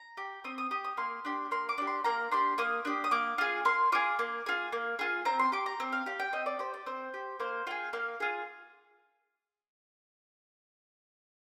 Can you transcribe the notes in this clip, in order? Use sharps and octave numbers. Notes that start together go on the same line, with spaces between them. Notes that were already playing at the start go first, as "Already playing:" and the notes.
Already playing: A#5
G4
C4 D#6
D#6
G4 D#6
D#6
A#3 C6
D4 G4
A#3 C6
D6
D4 G4
C6
A#3 A#5
D4 G4 C6
A#3 D#6
D4 G4
D#6
A#3 D6
F4 G#4
A#3 C6
F4 G#4 D6
A#3
F4 G#4
A#3
F4 G#4
C4 A#5
C6
G4 D6
A#5
C4
F5
G4 F5
G5
C4 D#5
D5
G4 C5
D5
C4 C5
G4
A#3 C5
F4 G#4 G5
A#3 F5
F4 G#4